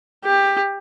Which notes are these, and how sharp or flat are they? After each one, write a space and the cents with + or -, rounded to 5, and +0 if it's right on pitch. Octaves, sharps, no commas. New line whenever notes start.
G4 +15